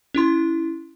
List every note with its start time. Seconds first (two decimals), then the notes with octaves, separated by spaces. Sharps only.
0.14 C#4 E4 C6